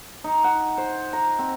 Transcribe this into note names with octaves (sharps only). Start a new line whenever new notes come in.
D#4
F#5
C5
A#5
C4